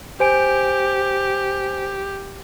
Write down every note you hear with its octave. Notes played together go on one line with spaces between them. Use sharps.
G4 C5 G#5 D7